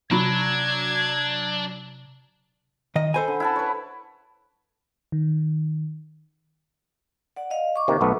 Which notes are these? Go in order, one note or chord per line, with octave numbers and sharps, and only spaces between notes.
C3 F#3 D4 B5 G#6
D#3 D#5
A4 C5 G#5 B5
D3
E4 F#5 A5
B4 C#5
D#3
D5 F#5
D#5 F5
C#6 D6
C3 D#3 A#3
B1 A3 B3